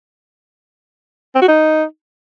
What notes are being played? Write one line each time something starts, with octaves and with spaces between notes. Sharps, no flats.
C4
F#4
D#4